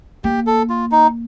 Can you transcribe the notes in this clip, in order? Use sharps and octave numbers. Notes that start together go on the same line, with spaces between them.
A#3 G4
A4
F4
D#4